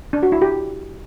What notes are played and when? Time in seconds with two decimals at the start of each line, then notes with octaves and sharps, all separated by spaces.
0.13 D4
0.23 F#4
0.32 E4
0.42 G4